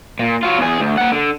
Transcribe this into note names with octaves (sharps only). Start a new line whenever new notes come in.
A#2
F#3 F4
E2 G#4
D2
A#3 F#5
D3